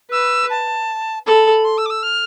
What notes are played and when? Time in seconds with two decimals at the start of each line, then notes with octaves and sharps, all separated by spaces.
0.11 B4 E6
0.50 A5
1.27 A4 B5
1.64 C6
1.78 E6
1.86 D6
1.90 E6
2.03 F6